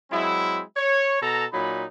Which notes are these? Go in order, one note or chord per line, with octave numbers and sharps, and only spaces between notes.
F#3 G#3 C4 E4
C#5
B2 A4 A#5
A#2 F#3 D#4 B5